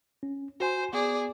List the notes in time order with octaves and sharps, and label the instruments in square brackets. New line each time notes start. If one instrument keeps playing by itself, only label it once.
[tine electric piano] C#4
[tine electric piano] F#4 G#5 [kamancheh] C5
[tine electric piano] B3 [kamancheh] G#4 D5